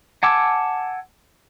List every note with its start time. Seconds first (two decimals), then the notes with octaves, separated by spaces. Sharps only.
0.23 F#5 G#5 A5 D6 E6